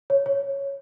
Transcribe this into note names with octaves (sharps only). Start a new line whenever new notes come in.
C#5
C#5